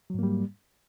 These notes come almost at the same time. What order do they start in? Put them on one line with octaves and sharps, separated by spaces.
F#3 G#2 A#3 G3